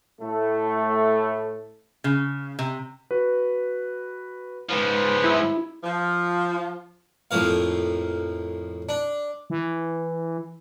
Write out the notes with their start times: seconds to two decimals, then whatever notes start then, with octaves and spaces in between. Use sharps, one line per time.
0.21 A2 A3
2.04 C#3
2.59 C3
3.11 F#4 B4
4.69 G#2 F3 B4 C5
5.24 E4 G#6
5.84 F3
7.31 F2 A2 F3 A#3 F5
8.89 D4
9.50 E3